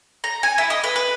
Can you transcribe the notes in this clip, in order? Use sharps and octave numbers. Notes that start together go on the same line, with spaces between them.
A#5
G#5
E4
D#5
B4
B4